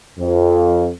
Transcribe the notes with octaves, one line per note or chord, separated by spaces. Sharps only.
F2